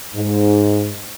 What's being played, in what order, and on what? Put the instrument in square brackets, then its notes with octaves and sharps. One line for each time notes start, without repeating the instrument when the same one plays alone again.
[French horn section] G#2